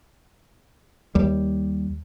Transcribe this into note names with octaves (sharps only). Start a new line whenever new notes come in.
D#2 G3